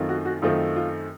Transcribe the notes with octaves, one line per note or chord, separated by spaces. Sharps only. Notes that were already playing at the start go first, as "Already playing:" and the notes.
Already playing: F#2 D#3 A3 C4 F4
F#4
F#4
F#2 D#3 A3 C4 F4
F4